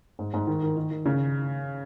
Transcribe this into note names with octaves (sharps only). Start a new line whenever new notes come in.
G#2
G#2
D#3
D#3
D#3
D#3
C#3